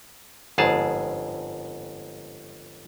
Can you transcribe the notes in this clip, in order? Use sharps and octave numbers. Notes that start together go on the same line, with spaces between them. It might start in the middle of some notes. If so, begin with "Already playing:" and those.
G1 F2 G#2 G#4 A5